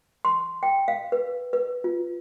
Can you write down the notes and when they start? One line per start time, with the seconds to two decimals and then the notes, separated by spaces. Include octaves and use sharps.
0.25 C6
0.63 G5
0.88 F5
1.12 B4
1.53 B4
1.84 F4